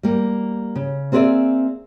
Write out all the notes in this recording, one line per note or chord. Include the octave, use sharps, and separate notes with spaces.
G3 A#3
C#3
A#3 C4 G#4 B4 D5 E5